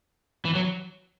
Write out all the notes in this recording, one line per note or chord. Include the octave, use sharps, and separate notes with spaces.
E3
F#3